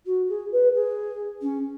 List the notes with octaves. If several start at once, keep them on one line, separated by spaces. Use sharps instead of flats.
F#4
G#4
B4
G#4
C#4